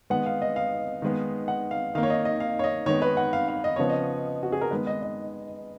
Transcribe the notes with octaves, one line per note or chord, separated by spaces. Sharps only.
D#3 G#3 B3 F#5
F5
D#5
F5
D#3 G#3 B3
F#5
F5
D#3 A#3 F5
C#5
D#5
D#5
F5
C#5
D#5
D#3 G#3 B3 C#5
B4
F#5
F5
F5
D#5
C#3 F3 B3 C#5
D#5
F#4
G#4
A#4
D#3 G#3 B3 B4
D#5
D#5